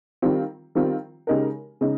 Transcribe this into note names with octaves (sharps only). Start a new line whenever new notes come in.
D#3 G3 C4 F4
D#3 G3 C4 F4
C#3 G#3 D#4 G4 A#4
C#3 G#3 D#4